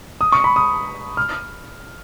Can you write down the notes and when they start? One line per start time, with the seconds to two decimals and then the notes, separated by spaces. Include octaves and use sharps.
0.21 D#6
0.32 C#6
0.44 B5
0.56 D#6
1.17 F6